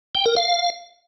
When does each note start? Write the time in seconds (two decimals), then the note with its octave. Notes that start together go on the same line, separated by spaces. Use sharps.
0.15 G5
0.26 A#4
0.37 F5